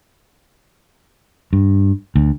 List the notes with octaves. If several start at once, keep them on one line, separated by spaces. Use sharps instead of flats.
G2
D2